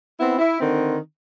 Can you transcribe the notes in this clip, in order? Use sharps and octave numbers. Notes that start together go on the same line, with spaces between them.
B3 C4 E4
E4
D3 D#3 C4